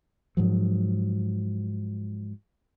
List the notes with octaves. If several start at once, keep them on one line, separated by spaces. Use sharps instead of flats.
G#2 F3 F#3